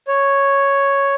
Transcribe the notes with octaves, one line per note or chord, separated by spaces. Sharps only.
C#5